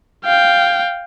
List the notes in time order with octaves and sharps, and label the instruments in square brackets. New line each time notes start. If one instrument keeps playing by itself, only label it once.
[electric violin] F5 G5